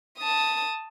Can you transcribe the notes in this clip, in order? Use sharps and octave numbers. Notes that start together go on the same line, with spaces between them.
A5 D#6